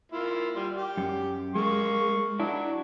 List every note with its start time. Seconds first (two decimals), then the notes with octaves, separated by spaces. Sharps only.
0.12 A#3 E4 F4
0.55 G3 F4
0.77 G4
0.97 F#2
1.56 G#3 A#3 C#6
2.40 F#3 D4 E4